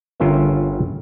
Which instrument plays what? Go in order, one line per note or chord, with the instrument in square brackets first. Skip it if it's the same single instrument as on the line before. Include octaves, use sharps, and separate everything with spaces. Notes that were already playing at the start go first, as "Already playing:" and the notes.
[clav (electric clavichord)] G1 G2 C#4 F4 A#4 E5